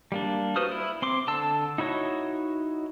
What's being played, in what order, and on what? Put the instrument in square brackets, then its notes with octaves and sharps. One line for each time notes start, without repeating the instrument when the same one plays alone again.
[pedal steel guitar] G3 A#3 D4
F#4 B4 C5 D#6 F6
E4
C4 C6 D6
D3 A5 E6
D#4 E4 F#4 C#5 D#5